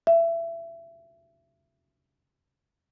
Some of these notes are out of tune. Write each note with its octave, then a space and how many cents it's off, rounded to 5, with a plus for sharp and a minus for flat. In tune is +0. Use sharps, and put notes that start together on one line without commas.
E5 +25